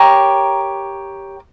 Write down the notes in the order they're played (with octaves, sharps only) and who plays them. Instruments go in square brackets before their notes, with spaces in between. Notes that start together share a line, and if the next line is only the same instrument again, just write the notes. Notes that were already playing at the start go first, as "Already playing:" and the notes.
Already playing: [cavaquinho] G4 A#4 C#5 A#5